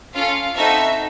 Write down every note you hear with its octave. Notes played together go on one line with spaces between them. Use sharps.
C#4 F4 A4 F5
C4 D#4 F#4 A4 E5